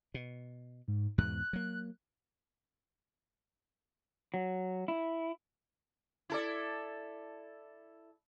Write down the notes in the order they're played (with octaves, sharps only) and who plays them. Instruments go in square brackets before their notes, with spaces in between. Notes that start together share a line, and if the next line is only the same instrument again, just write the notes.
[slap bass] B2
[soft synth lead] G#2
[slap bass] E2 G#2 B2 [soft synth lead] F#6
[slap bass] F#3 A#3
[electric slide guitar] F#3
E4
[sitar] E4 A4 D5